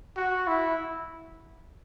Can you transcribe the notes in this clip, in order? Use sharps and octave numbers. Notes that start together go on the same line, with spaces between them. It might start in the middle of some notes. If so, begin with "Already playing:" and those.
F#4
E4